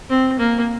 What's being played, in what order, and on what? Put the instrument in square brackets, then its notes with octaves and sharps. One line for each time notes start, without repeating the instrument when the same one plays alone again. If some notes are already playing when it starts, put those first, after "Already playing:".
[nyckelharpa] C4
A#3